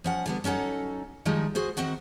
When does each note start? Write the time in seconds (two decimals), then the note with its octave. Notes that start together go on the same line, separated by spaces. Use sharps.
0.04 F3 C#4 F#5
0.26 D3 G3 B3
0.44 F#3 C#4 D#4 A4 F#5
1.25 D#3 F3 G3 G#3 D#4
1.55 F#4 G#4 C5
1.77 D#3 C4 F#4 F#5